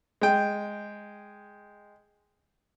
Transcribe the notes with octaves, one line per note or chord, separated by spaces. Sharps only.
G#3 G5